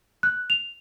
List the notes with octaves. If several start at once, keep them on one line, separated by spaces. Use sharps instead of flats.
F#6
F7